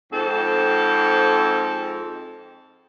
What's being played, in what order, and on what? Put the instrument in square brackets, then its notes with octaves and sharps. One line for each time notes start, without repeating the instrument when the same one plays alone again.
[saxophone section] F2 G#2 C4 A4